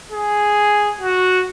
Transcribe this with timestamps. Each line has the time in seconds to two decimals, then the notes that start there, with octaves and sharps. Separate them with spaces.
0.12 G#4
1.01 F#4